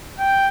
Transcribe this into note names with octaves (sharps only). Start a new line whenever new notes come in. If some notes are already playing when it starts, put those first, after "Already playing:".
G5